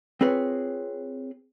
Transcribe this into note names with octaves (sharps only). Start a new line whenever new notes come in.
C4 F4 G#4 B4 C#5